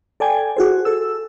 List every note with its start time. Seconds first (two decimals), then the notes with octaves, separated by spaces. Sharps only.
0.20 A4 D5 G5 G#5
0.57 F#4 G#4 C5
0.85 A4 E6